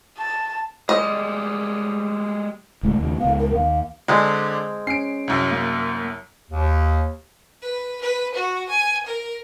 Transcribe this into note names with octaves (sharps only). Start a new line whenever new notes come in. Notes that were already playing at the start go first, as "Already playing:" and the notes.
A5
G3 G#3 D#5
D1 C#2 A2
D#2 C#3
C#2 B3 F5
A#4
D#2 F5
D3 G#3 C4 D4
C#4 C7 D7
C2 F#2
A#3
D#2
B4
B4
F#4
G#5
A#4